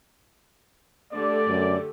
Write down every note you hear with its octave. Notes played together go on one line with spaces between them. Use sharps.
D3 A3 G4 D5
F#2